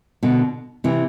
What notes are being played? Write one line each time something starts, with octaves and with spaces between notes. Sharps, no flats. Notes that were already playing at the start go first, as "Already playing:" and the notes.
B2 D3
C3 E3